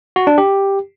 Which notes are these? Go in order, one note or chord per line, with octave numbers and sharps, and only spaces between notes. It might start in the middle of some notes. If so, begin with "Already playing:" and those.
F#4
D4
G4